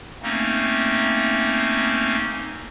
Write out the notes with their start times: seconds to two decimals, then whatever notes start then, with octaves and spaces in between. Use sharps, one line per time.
0.23 A3 A#3 C4 C#4 D#4